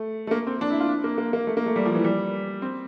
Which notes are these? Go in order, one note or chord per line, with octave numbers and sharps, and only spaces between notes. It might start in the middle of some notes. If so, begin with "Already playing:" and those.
Already playing: A3
A3
A#3
C4
D4
E4
F4
A#3
A#3
A#3
A3
A#3
A3
G3
F3
E3
G3
C4